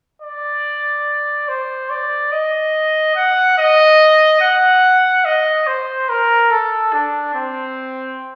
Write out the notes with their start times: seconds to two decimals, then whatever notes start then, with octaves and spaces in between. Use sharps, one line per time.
0.22 D5
1.48 C5
1.90 D5
2.32 D#5
3.16 F#5
3.58 D#5
4.41 F#5
5.25 D#5
5.67 C5
6.10 A#4
6.51 A4
6.93 D4
7.35 C4